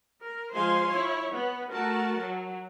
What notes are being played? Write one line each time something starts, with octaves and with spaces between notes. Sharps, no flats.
A#4
F3 G#3 C5 F5 G#5 C6
E4 C#5
B3
A3 F#4 A#4 A5
F#3